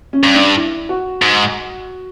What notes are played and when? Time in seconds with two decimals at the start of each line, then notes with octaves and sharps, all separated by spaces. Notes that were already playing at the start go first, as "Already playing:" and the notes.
0.13 C#4
0.24 G2
0.35 D4
0.57 E4
0.89 F#4
1.22 G#2